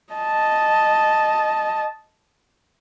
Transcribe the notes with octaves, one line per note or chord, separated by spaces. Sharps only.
D#5 A5